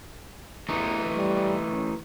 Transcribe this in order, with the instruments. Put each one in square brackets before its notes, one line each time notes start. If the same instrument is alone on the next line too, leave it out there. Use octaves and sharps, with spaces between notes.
[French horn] E2 [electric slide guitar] E3 A3 D#4
[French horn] G3
C#4